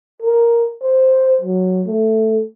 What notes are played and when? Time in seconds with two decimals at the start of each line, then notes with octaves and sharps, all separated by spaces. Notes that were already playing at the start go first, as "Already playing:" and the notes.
0.22 A#4
0.83 C5
1.41 F#3
1.88 A3